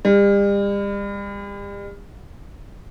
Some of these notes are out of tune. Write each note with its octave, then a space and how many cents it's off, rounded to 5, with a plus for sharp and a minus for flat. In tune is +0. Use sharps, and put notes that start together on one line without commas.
G3 +40